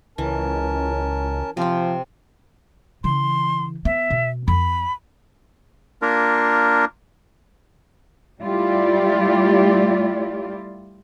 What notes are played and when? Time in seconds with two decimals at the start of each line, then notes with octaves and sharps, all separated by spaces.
0.18 C#2 E3 C#4 A#4 A5
1.57 C3 F3 C4
3.04 C#3 E3 C6
3.85 B3 E5
4.10 B2
4.48 F2 B5
6.02 A#3 D4 F4 A#4
8.41 G3 A3 E4 F4 G4 D5